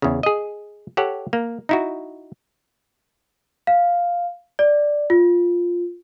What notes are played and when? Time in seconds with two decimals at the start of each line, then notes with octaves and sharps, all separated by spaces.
0.02 E2 C#3
0.23 G#4 D#5
0.97 G4 A4 C#5 F#5
1.33 A#3
1.69 D#4 E4 F#4
3.67 F5
4.59 D5
5.10 F4